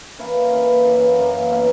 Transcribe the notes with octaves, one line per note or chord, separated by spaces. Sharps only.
E3 A#3 C#4 E4
E3 A#3 C#4 E4
F#2 E3 A#3
F#2 E3 A#3
B2 A#3 C#4 E4